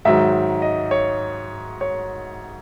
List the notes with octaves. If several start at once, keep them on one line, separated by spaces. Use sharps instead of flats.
G#2 D#3 F#3 E5
D#5
C#5
C#5